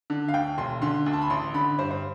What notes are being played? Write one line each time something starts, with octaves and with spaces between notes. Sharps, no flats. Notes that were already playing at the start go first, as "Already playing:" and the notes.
D3
F5
D2 G5
E1 C6
D3 C6
D2
A5
B5
A1 C6
D3 B5
G2 C5
C5